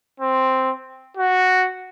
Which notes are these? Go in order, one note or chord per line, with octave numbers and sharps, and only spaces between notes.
C4
F#4